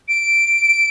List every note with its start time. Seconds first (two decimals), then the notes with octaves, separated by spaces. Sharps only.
0.09 D7